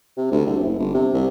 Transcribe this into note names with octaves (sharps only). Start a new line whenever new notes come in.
C3
D2
C2
F#1
G1
C3
C2